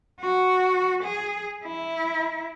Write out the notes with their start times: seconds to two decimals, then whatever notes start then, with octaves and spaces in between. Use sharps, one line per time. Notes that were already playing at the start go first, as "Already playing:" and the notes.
0.20 F#4
1.03 G#4
1.64 E4